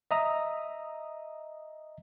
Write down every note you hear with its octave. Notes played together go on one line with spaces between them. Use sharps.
D#5 E5 A#5 D#6